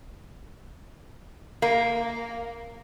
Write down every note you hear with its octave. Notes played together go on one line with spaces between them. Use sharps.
A#3